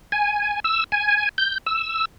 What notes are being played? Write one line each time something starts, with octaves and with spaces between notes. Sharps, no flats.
G#5
E6
G#5
G6
E6